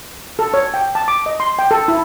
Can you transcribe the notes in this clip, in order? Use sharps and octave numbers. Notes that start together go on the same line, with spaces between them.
A4
C#5
G5
A5
D6
D#5
C6
G5
A4
E4